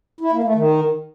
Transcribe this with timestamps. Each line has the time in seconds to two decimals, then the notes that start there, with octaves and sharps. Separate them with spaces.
0.21 E4
0.32 A#3
0.44 A3
0.55 D#3